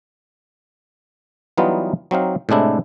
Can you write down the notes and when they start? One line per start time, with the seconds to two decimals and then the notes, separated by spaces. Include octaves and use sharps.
1.58 E3 F#3 G3 B3 D#4 F4
2.11 F#3 C4 D#4 F5
2.49 A2 C3 G#3 D4 E4